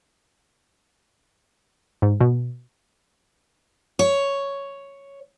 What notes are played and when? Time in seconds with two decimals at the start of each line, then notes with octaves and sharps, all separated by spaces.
2.02 G#2
2.21 B2
3.99 C#5